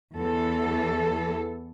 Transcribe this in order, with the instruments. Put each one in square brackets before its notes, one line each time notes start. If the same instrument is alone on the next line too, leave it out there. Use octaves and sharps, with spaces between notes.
[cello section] E2 E3 A4